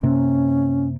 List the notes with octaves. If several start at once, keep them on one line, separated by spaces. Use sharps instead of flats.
F#2 C3 A#3 C#4